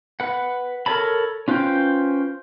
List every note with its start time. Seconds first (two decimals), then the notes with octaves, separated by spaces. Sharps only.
0.20 B4 F#5
0.86 A4 A#4 C#5 A5 B5
1.48 C#4 F4 B4 C5 G5